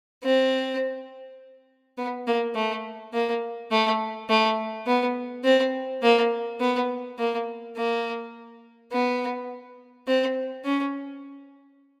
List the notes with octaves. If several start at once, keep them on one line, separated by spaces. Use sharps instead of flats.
C4
B3
A#3
A3
A#3
A3
A3
B3
C4
A#3
B3
A#3
A#3
B3
C4
C#4